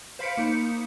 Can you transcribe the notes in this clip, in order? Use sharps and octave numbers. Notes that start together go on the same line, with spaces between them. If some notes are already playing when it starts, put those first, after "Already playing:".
C5 F5 B5 B6 C#7 D7
A#3 D#4 C#7